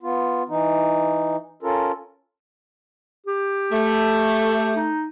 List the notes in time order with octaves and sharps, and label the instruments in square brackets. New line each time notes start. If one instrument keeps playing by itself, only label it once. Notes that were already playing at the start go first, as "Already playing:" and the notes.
[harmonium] B3 F4
E3 D#4
C#4 F4 A4 A#4
[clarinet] G4
[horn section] A3
[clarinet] D#4